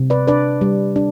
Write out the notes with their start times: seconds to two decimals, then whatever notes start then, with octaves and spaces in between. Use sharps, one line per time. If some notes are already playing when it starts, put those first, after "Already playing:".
Already playing: C3
0.10 B4 D5
0.28 D4 B4 D5
0.61 G3
0.96 D4